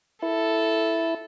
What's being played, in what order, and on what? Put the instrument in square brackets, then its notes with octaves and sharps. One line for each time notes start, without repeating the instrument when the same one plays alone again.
[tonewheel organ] E4 [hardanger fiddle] A4